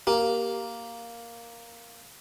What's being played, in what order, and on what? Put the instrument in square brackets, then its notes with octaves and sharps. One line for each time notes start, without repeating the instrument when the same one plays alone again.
[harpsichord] A#3 [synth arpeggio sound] G4